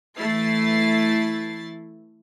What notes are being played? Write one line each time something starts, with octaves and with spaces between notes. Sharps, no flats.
E3 A3 E4 A6 C7